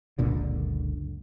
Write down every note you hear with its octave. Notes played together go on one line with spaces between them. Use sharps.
F#1 C#2 A#2 D3